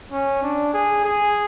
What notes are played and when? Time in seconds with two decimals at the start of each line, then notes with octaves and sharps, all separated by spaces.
0.12 C#4
0.42 D4
0.73 G#4
1.04 G#4